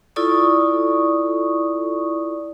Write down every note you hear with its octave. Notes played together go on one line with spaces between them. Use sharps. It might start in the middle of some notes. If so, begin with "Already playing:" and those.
E4 F4 A4 D5 C#6 D#6